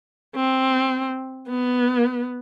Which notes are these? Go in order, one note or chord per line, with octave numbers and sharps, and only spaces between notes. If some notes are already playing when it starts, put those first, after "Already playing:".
C4
B3